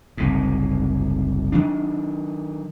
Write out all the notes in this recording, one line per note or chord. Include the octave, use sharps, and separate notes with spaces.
F#1 C2 G#2
D#3 F3 F#3 D4